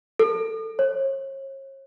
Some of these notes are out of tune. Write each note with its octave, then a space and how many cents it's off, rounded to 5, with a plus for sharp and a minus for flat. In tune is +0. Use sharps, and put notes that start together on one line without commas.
A4 +20
C#5 -40